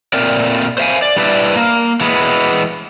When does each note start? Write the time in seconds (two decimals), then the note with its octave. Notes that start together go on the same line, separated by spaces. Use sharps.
0.13 A#2 A3 C4 A#4 D5
0.78 C5 E5 F5 G#5
1.02 D5
1.17 G3 D4 E4 B4 D5 E5
1.56 A#3
2.01 E3 G#3 B3